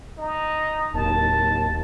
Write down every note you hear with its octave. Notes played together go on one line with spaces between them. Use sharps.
D#4
D1 D#2 A5